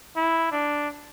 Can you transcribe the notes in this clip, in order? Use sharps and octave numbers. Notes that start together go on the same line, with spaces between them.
E4
D4